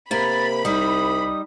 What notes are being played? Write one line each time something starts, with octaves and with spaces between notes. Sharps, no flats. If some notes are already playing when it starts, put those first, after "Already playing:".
C3 A#3 A#4 B5 A6
C2 G3 D#4 D#6